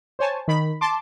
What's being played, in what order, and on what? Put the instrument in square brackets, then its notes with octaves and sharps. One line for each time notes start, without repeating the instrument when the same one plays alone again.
[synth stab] C5 C#5 G#5 A5
D#3 B5
A5 C6 D6